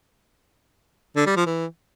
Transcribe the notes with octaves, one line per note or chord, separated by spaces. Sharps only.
D3
G3
F3
E3